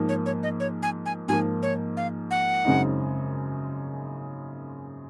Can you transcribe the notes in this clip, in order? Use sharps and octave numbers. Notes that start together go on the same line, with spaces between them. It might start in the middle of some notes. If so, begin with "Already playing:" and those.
Already playing: G#2 F3 A#3
C#5
C#5
D#5
C#5
G#5
G#5
G#2 F3 A#3 G#5
C#5
F5
F#5
F#2 C#3 G#3 C4 D#4